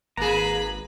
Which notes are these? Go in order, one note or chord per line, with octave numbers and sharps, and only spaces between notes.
G#1 A#3 G#4 B4 A#5 B5